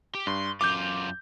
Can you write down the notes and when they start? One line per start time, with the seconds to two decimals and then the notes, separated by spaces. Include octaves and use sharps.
0.15 G4
0.27 G2 C6
0.61 F#2 F4 D6 G6